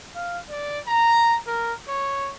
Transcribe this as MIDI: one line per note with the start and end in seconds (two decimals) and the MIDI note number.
0.15 0.38 77
0.50 0.79 74
0.87 1.36 82
1.47 1.72 70
1.88 2.32 73